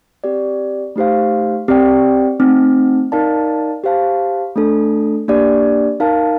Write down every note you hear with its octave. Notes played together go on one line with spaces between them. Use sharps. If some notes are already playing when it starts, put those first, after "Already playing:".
C4 G4 D5
A3 D#4 G4 C5 F5
C4 G4 D5 G5
A3 C4 D#4
D#4 A#4 D5 F5 A5
G4 C5 F5 A5
A3 D4 A4
A#3 D4 G4 D5
D#4 A#4 F5 A5